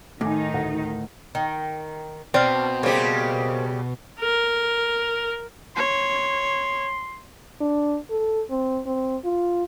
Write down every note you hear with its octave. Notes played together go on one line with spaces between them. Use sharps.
A2 D#3 D#4 G#5 D6
D2 A3 F#5
D#3
B2 C4 D4 F5
C#3 G3 A#3 G4 C5
A#4
C#5 C6
D4
A4
C4
C4
F4